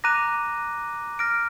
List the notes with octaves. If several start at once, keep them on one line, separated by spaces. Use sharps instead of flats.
A#5 D6 F#6 A#6 D#7
F6 A#6 D7